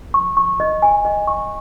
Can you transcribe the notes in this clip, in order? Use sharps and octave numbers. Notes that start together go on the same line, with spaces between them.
C#6
C#6
D#5
G#5
D#5
C#6